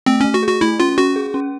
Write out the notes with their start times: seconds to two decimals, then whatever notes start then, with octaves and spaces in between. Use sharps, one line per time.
0.06 A3 C4
0.21 A3 C#4
0.34 F#4
0.43 G#4
0.48 F#4
0.61 A3 E4
0.79 C#4 F4
0.98 C#4 F#4
1.16 G#4
1.34 C#4